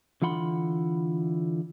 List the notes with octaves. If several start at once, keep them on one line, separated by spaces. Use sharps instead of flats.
D3 E3 F4 F#5 B5 C6